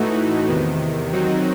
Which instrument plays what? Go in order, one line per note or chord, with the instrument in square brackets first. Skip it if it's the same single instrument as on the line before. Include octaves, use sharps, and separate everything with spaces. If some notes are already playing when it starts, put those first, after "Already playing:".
Already playing: [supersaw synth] A2 E3 A3 D#4 F#4
E2 C3 D#3
D#3 F#3 C4 D#4 F#4